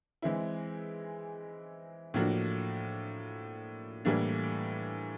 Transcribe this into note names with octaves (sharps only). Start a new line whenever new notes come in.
E3 G#3 C4 E4
A2 F3 A#3 D4 F#4
A2 E3 G3 A#3 D4